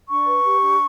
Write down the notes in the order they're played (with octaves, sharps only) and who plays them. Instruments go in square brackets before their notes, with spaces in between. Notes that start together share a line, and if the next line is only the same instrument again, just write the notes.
[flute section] D4 C#6
B4
G4
D4